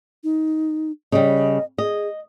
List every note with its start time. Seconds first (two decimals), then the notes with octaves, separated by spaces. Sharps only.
0.24 D#4
1.12 C#3 G3 D#5
1.78 G#4 D#5